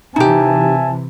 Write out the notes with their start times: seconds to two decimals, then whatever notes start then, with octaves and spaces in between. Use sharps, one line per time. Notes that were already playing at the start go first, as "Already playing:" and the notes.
0.16 C3 E3 D#4 G4 E5 G#5 A5